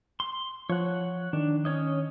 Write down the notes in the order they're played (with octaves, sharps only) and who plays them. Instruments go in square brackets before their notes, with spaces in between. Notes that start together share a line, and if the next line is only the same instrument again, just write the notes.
[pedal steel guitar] C6
[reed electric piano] F3 [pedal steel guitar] C#5 F#5
[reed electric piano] D#3 [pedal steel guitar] D4
[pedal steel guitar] C#4 C#5 D#5